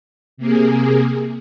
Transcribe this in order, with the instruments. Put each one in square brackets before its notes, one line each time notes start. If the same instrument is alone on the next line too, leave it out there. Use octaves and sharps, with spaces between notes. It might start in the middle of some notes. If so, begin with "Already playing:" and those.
[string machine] C3 A#3 G#4